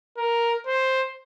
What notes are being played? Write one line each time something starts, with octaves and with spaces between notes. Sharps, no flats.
A#4
C5